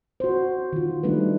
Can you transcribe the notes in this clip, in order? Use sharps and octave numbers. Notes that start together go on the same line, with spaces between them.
F#4 C5
D#3 F4
G3 A3 D4 D#4 B4